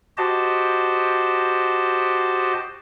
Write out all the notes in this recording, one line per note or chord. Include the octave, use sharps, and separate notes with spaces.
F#4 G4 C5 D#5 A5